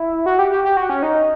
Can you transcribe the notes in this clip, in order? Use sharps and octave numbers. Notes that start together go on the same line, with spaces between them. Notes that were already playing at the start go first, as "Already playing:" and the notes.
Already playing: E4
F#4
G4
G4
G4
F#4
C#4
D#4